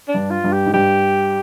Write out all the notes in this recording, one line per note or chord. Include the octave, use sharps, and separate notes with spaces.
D4
G2
F4
G2
G4
G#2
G2 G4